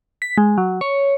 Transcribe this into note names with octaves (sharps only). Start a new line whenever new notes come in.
B6
G#3
F#3
C#5